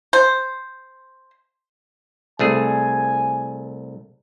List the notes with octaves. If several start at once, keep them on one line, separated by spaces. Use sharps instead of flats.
C5
C2 A3 G#4 G#5